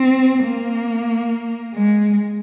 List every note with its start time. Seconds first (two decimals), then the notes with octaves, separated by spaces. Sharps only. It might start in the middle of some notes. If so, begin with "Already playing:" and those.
Already playing: C4
0.44 A#3
1.75 G#3